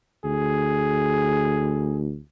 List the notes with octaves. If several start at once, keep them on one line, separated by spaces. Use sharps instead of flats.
D2 G#4